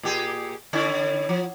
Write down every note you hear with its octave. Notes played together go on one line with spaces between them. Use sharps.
A#2 G4 G#4
D3 C#4 E4
F3